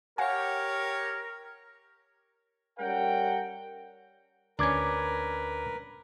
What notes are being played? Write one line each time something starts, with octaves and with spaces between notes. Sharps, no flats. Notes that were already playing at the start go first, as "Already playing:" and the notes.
G4 A#4 C#5 F5 F#5 G#5
G3 C#4 A#4 F#5 G5
D2 C#4 D4 A#4 B4 D6 G#6